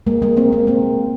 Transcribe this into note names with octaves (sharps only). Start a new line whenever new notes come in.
G#3 A#3
G#3 A#3
A#3 C4
A#3 C4
A#3 C4